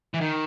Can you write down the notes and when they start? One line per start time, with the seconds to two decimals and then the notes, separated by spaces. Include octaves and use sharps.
0.14 E3
0.21 D#3